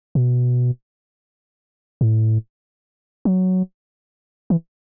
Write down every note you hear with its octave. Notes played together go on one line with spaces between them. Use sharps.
B2
A2
F#3
E3